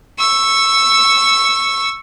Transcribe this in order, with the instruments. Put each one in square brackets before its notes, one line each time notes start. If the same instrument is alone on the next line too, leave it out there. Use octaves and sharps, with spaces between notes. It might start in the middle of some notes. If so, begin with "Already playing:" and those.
[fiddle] C#6 E6